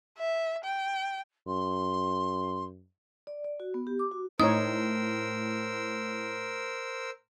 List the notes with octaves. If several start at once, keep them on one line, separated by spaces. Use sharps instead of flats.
E5
G5
F#2 C6
D5
D5
F#4
B3
G4
D6
F#4
A2 D#4 A#4 C5 C#5 D#6 E6